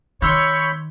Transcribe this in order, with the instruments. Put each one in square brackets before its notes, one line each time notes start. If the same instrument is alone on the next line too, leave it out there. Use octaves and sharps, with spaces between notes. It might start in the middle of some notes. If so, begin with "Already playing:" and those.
[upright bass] D#3 [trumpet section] C#5 [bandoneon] B5 G6 [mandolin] C6 E6 F6